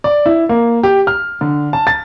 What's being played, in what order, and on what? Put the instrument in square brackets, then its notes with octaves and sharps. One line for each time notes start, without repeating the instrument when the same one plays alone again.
[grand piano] D5
E4
A#3
G4
F6
D3
A5
A6